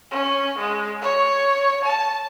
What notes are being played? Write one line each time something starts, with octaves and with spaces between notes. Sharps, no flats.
C#4
G#3
C#5
A5